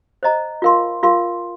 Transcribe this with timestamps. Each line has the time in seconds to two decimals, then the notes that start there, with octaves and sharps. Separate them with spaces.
0.23 C5 D#5 A#5
0.62 F4 A#4 F5 C6
1.03 F4 A#4 F5 C6